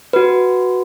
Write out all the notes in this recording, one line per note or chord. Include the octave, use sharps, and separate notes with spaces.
F#4 B4